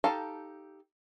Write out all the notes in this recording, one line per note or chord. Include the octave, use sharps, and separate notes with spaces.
D#4 G4 A4 F5 A5